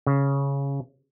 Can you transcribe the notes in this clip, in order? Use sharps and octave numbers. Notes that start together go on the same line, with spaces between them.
C#3